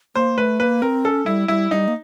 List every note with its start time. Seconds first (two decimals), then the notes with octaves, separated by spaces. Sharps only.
0.15 A#3 C5
0.38 A3 B4
0.60 A#3 B4
0.82 C4 A#4
1.04 C#4 A4
1.26 G3 E4
1.48 G3 E4
1.71 G3 D#4
1.88 A#3